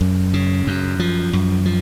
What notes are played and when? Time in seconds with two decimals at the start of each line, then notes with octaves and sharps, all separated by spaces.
0.01 F#2
0.34 C#3
0.67 F#2
0.99 F3
1.33 F#2
1.65 F3